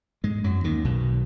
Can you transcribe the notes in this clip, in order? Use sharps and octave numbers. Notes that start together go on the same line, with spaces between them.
G#2 G#3
F#2 F#3
D#2 D#3
B1 B2